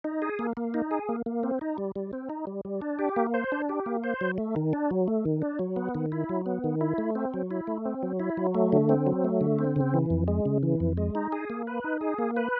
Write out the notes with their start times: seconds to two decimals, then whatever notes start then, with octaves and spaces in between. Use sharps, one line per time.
0.04 D#4
0.22 G#4
0.39 A#3
0.57 A#3
0.74 D#4
0.91 G#4
1.09 A#3
1.26 A#3
1.43 C4
1.61 D#4
1.78 G3
1.96 G3
2.13 C4
2.29 D#4
2.47 G3
2.65 G3
2.81 D4
2.99 G4
3.16 A#3
3.34 C5
3.52 D4
3.69 G4
3.86 A#3
4.04 C5
4.21 F#3
4.38 A3
4.56 D#3
4.73 D4
4.91 F#3
5.08 A3
5.25 D#3
5.42 D4
5.59 F#3
5.76 B3
5.95 D#3
6.12 E4
6.29 F#3
6.46 B3
6.64 D#3
6.81 E4
6.98 A3
7.15 C4
7.34 F#3
7.51 E4
7.67 A3
7.85 C4
8.03 F#3
8.20 E4
8.37 F#3
8.55 A3
8.72 D3
8.89 C4
9.07 F#3
9.24 A3
9.41 D3
9.59 C4
9.76 C#3
9.94 E3
10.10 F2
10.28 G#3
10.45 C#3
10.63 E3
10.80 F2
10.97 G#3
11.15 D#4
11.32 G#4
11.50 A#3
11.67 B4
11.84 D#4
12.01 G#4
12.18 A#3
12.37 B4